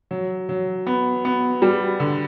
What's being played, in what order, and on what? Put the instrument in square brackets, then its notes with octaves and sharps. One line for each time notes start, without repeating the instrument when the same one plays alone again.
[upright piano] F#3
F#3
B3
B3
G3
D3